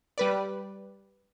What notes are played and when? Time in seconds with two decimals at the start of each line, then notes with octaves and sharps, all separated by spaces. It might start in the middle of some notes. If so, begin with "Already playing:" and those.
0.18 G3 B4 D5